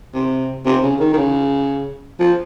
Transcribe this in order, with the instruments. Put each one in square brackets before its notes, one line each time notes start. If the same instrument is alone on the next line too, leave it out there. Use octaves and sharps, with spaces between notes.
[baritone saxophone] C3
C3
C#3
D#3
D#3
C#3
F3